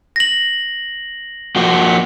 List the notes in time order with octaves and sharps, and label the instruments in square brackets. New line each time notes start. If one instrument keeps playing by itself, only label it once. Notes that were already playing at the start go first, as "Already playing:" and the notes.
[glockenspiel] A#6 F#7
[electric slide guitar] F3 A#3 F#4